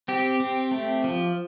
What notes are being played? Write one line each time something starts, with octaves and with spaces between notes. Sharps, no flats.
C4 G4
C4
A3
F3